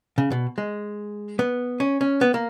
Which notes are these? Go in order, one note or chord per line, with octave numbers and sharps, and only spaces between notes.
C#3
B2
G#3
B3
C#4
C#4
B3
A#3